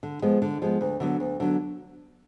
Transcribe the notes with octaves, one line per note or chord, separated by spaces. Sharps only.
D3
F3 G#3 B3
D3
F3 G#3 B3
D2
D3 F#3 B3
D2
D3 F#3 B3